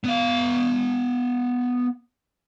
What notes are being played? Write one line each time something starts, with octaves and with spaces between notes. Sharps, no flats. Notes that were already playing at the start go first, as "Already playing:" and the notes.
B3 F5